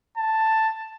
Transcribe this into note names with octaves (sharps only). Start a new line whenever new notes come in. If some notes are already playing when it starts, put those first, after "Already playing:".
A5